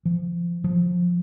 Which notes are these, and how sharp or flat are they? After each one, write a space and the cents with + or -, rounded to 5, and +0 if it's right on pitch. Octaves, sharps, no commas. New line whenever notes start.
F3 -20
F3 +20